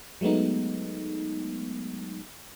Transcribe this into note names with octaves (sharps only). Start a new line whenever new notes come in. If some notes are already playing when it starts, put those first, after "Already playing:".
F#3 G#3 A3 B3 D#4